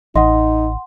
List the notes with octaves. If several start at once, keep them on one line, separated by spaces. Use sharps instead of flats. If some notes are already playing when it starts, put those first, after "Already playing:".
A1 D#4 D#5 F#5 C6